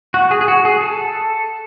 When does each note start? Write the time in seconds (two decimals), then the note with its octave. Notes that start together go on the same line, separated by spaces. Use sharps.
0.14 F#4
0.31 G#4
0.41 G#4
0.48 F#4
0.65 G#4
0.81 A4